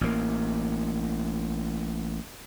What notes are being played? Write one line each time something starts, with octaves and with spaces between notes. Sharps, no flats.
A1 A#3